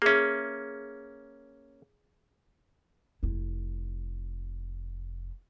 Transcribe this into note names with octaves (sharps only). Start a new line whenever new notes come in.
A#3 C#4 G#4 E5
F1 E4